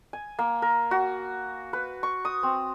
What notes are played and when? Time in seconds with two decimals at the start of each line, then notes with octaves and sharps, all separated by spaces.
0.13 G#5
0.39 A#3
0.62 A#4
0.91 F#4
1.73 B4
2.03 C#6
2.25 D#6
2.43 C4